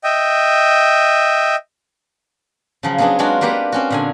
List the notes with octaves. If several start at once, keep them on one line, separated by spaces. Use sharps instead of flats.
D#5 E5 G5
C#3 F3 F#3
F#3 B3 C4 D4 G#4
F#3 G#3 D4 F4 F#4
A#3 F4 G4 B4 F#5
C4 C#4 F#4
A#2 D3 G#5